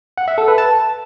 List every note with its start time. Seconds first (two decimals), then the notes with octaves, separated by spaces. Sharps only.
0.18 F#5
0.28 E5
0.38 A4
0.48 B4
0.58 A5